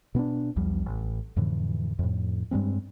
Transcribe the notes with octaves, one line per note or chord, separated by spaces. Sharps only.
B2 B3 C4 D4
B1 E2 F3 G3
A1
F2 A2 D3 E3
F2 A2
G2 G3 G#3 C4